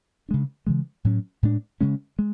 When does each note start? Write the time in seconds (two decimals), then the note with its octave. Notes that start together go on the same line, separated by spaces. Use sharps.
0.29 C#3 G#3 D4
0.67 C#3 E3 G#3
1.05 A2 F#3 C#4
1.43 A2 G#3 D4
1.81 C#3 G#3 C#4
2.19 G#3